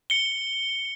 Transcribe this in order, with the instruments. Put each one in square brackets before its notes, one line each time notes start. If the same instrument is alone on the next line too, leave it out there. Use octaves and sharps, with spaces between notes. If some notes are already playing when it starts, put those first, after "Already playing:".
[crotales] C#7 G7